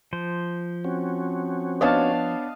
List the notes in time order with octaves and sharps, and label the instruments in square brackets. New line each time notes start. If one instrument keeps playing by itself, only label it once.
[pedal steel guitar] F3 C5
[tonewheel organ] C4 C#4 F#4
[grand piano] B3 D4 C#5 [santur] D#5 F5 A5